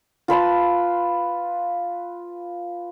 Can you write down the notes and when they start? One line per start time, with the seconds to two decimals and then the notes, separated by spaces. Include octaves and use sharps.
0.28 F4 B4 A5 C6